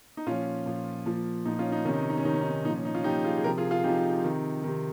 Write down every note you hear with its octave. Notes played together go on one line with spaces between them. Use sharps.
D#4
A#2 F3 C#4 F4
A#2 F3
A#2 F3
A#2 F3 D#4
C#4 F4
D#4
C3 D#3 C#4
D#4
C#4
D#4
C#4
C3 D#3 D#4
C#4
D#4
C#4
A#2 F3 D#4
C#4
D#4
C#4 F4
A#2 F3 D#4 G4
F4 G#4
G#4
C3 F3 G4 A#4
F4 G#4
F4 G#4
C3 F3 D#4 G4
C3 D#3
C3 D#3